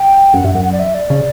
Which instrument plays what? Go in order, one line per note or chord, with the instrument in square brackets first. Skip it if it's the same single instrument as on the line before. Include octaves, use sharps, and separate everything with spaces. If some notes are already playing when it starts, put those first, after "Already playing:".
Already playing: [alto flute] G5
[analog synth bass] F#2 [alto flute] F#5
[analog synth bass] G2 [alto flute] E5
[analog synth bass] F#2 [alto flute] F#5
[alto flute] F#5
D5
E5
D5
[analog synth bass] C#3